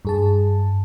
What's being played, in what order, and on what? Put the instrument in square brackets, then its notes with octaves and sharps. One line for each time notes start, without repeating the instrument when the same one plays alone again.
[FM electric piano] G2 G#4 A5